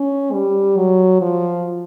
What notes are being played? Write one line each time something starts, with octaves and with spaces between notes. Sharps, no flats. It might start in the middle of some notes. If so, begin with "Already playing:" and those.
Already playing: C#4
G3
F#3
F3